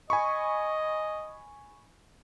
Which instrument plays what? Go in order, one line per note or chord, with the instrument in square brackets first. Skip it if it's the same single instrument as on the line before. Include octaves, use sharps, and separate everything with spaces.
[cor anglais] D#5 [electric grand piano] G#5 B5 C#6